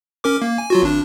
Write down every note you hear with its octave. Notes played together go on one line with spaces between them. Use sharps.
C#4 A#4 D6
A#3
G#5
F#3 F4 F#4
G#1 D4